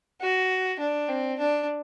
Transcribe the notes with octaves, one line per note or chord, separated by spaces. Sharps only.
F#4
D4
C4
D4